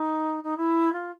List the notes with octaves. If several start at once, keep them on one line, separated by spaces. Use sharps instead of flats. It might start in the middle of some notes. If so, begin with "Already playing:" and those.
Already playing: D#4
D#4
E4
F4